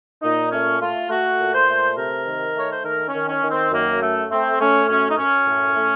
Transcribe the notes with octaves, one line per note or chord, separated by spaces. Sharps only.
A#2 D#4
A3 C#4
A3 F4
A3 F#4
A#2
C5
A3
C3 A#4
D#3
A3 C#5
C5
D#3 A#4
C#4
D#3
C#4
D#3
C4
F#2 A#3
A3
A3 C4
A3 C#4
F#2 C#4
D#4
F#2 C#4
A2
A3